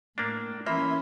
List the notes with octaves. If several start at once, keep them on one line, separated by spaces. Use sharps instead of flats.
A2 A#3 D4
E3 A#3 C#4 E4 E5 C6